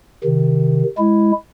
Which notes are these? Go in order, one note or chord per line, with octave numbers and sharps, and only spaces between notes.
C3 D#3
G#3 E4